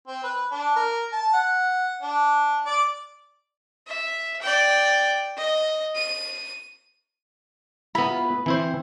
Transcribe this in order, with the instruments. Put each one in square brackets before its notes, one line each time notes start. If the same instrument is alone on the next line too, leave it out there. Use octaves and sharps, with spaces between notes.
[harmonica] C4
B4
D4
A#4
A5
F#5
D4
D5
[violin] E5
D5 G5
D#5
D#7
[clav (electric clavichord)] B3 E4 [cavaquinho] B5
[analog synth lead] F4
B4
[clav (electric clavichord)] E3 E4 C5 [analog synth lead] C4